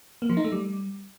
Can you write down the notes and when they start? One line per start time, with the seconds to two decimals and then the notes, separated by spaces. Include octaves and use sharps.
0.22 A#3
0.29 F3
0.37 D#4
0.44 A3
0.52 G3